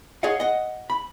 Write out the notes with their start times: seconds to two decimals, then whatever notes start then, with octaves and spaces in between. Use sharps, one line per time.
0.23 G#4 C#5 D#5 F5 F#5
0.40 D#5 F#5
0.90 B5